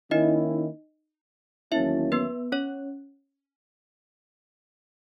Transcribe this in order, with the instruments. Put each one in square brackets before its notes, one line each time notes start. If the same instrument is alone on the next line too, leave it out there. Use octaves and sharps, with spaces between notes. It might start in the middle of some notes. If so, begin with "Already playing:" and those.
[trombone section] D#3 A#3 C#4 E4 [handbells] D#4 D#5
[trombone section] E2 D#3 F#3 A#3 C#4 [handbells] E4 E5
[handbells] B3 B4
C#4 C#5